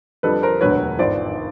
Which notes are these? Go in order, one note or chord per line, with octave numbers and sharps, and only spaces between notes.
F2 D3 G3 A4 B4
A#4 C5
E1 D2 D3 F#3 B4 C#5
G#1 G2 D3 F3 C5 D5